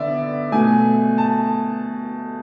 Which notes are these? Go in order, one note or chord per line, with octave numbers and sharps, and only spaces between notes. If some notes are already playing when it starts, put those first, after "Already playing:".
Already playing: D3 B3 D5 E5
B2 A3 G#5
A5